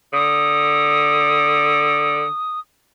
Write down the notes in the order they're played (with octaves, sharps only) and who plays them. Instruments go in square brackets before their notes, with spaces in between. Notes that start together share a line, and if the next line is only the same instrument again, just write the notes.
[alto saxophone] D3 [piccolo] D#6